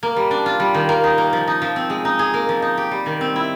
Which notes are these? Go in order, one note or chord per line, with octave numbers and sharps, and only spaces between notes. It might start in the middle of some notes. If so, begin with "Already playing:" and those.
A#3
G3
D4
F4
G3
D#3
A#3
D#4
A#3
F3
D#4
F3
C4
G#3
D#4
G#4
A#3
F3
D#4
G4
G3
D#3
C4
E4